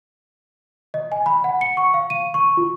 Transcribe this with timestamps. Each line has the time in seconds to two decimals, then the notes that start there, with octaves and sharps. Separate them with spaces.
0.94 D#5
1.12 G#5
1.26 B5
1.44 F#5
1.61 C#7
1.77 C#6
1.94 F5
2.10 D#7
2.34 C#6
2.57 F4